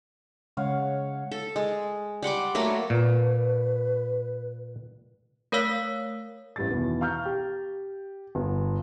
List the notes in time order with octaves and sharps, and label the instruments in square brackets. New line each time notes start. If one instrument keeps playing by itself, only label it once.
[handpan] C#3 G#3 [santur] C#5 F5 F#5
[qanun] A4
G#3
G3 F#5 C6 D6
F#3 A3 A#3 A#4
[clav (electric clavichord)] A#2 [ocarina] B4
[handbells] A3 A#4 C#5 F5 E6 B6
[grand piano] A1 G3 A6
E2 B2 D#3
F5 A#5 C#6 F6 G6
G4
G1